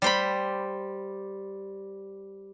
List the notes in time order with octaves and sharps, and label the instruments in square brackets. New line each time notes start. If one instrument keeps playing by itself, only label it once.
[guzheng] G3 C5 B5